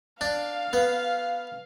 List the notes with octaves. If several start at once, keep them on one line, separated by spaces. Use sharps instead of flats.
D4 F5
B3